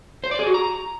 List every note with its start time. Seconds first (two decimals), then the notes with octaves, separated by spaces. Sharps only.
0.24 C5
0.31 D5
0.39 G#4
0.47 F#4
0.54 A#5